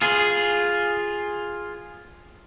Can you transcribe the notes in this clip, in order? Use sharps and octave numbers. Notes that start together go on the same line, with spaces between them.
F4 G#4